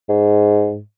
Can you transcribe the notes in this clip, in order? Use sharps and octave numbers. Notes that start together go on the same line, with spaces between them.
G#2